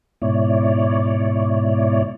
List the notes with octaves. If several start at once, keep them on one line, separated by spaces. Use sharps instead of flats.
G#2 B2 E4 C#5 D5